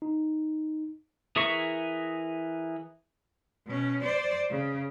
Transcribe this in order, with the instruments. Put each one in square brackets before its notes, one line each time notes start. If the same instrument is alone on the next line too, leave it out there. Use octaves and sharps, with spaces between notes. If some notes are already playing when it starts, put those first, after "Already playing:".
[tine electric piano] D#4
[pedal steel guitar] E3 G#4 A#4 E5 C#6
[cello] B2 C#4
C5 D5
C#3